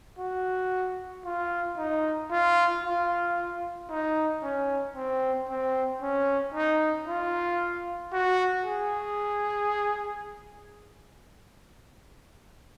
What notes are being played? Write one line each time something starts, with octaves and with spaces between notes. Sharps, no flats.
F#4
F4
D#4
F4
F4
D#4
C#4
C4
C4
C#4
D#4
F4
F#4
G#4